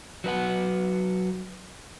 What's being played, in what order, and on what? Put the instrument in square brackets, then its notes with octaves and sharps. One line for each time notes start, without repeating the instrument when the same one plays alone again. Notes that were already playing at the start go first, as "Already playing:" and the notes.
[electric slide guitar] F#3 B4 F#5